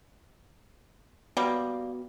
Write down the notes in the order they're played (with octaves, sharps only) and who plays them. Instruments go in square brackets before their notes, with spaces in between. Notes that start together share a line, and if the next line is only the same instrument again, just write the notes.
[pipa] G3 A#3 [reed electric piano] B3 F#4